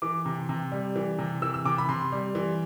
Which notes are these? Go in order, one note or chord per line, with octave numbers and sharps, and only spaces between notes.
E3 D6
C3
C3
G3
E3
C3
E3 E6
E6
C3 D6
B5
C3 C6
G3
E3